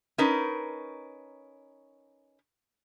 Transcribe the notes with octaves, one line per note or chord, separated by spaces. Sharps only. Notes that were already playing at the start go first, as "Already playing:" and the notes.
C#4 D#4 A#4 B4